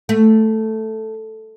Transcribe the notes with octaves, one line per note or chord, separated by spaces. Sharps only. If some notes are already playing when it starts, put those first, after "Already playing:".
A3